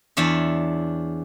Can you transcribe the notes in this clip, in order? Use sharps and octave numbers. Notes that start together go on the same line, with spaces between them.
E2 D4 C#5 E5